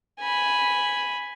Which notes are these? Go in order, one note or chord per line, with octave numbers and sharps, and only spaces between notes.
G#5 B5